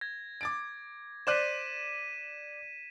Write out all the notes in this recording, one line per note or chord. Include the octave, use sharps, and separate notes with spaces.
G#6 A#6
D6 A6 D7
C5 D5 F#6 B6 D#7 E7